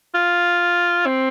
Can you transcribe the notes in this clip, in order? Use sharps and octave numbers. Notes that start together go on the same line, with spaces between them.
F4
C4